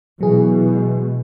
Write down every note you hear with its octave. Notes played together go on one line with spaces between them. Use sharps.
B2 E3 F#3 G#4
G#3